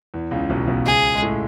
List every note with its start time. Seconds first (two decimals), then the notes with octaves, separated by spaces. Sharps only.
0.14 E2 E3
0.31 C#2 C#3
0.50 B1 B2
0.68 B1 B2
0.86 C#2 C#3 G#4
1.15 G#3
1.22 A2 A3